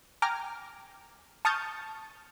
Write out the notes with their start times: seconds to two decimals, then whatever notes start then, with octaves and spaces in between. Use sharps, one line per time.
0.22 G5 G#5 A#5 D6 F6
1.45 A5 C#6 D#6 F6 G6 A6